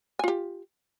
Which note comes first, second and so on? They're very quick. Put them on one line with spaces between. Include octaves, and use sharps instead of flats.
G#5 F4 G4